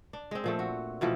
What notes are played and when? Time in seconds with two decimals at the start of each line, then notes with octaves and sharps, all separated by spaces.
0.13 D4
0.31 G#3 C4
0.44 A#2 F3 A3
0.59 F#4
1.01 B2 E3 F3 A3